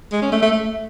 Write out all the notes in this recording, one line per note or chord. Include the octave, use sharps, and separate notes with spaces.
G#3
C#4
A3
A3
A3